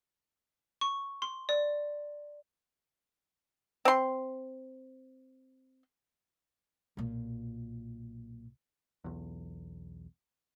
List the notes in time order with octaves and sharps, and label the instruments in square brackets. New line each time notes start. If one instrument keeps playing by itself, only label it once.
[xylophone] C#6
C6
D5
[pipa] C4 C6
[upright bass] B1 A#2
[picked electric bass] B1 E2